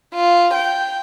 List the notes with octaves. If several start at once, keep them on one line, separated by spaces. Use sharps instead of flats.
F4
G5